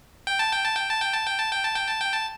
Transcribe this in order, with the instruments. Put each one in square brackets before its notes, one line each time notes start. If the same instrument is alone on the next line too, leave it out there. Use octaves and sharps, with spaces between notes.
[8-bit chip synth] G5
A5
G5
A5
G5
A5
G5
A5
G5
A5
G5
A5
G5
A5
G5
A5